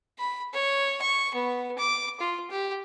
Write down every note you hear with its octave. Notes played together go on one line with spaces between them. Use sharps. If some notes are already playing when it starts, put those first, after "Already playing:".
B5
C#5
C#6
B3
D6
F4
G4